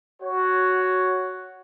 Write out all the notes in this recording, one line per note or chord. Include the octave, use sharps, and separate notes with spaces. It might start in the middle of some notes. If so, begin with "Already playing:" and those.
F#4 C#5